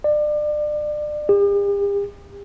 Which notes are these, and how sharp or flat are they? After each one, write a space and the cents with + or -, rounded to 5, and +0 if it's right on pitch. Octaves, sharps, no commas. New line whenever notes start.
D5 +30
G4 +45